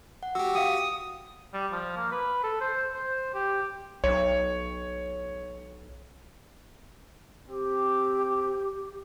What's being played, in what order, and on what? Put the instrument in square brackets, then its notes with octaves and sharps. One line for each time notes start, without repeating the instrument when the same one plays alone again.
[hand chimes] F#5
[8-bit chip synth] F#4 G4 [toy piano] E6
[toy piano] F5 G5 [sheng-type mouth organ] D#6
[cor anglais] G3
F3
A#3
B4
A4
C5
C5
G4
[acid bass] B1 [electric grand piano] C#5
[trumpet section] C4 D6 [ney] G4